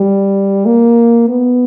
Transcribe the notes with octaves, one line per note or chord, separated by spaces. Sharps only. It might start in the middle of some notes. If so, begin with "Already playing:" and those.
Already playing: G3
A#3
B3